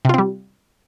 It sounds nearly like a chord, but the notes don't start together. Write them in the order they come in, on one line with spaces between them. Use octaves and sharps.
C3 F4 C4 G3